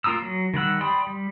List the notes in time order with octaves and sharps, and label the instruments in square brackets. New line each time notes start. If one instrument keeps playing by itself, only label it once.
[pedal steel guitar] A#3 F4 A#5 D#6 E6
F#3
D#3 G3 F#5 E6
D5 G5 B5 C6 D#6
G3